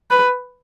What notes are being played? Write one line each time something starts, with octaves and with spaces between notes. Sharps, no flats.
B4